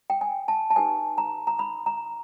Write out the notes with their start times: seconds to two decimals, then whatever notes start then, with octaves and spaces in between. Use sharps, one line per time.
0.10 G5
0.21 G#5
0.48 A5
0.70 A5
0.76 D#4 G4 B4 G#5
1.18 A#5
1.47 A#5
1.59 B5
1.86 A#5